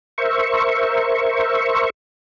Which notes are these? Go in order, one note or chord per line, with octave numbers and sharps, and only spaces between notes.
A#4 C5 E5 C#6